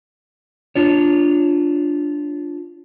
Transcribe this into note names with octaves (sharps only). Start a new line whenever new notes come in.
D4 F4 C#5